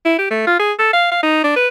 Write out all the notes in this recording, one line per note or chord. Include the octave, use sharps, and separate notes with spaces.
E4
G4
A3
F4
G#4
A4
F5
F5
D#4
D4
B4